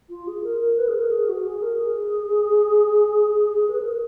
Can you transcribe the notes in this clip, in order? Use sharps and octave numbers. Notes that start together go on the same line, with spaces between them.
F4
G#4
A#4
A#4
B4
G#4
A#4
G#4
F#4
G#4
A#4
G#4
B4
A#4